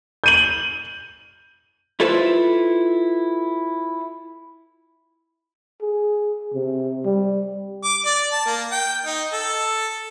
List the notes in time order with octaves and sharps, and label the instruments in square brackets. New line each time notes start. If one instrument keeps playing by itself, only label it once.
[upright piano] G6 D#7 F#7
[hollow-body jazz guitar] E4 F4 A4 B4 C5 E5
[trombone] G#4
C3
G3
[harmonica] D6
D5
A5
A#3
G5
D#4
A4